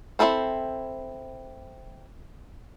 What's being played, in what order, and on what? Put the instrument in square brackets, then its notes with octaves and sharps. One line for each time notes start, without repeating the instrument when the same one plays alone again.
[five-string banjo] C4 D#4 E4 A4 C5